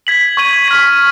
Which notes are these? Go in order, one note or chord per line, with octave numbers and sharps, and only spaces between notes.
G#6 B6 F#7
C#6 G#6 D#7 F#7
C#6 F6 B6